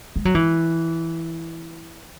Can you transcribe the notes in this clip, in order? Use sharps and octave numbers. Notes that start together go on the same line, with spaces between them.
G#3
F#3
E3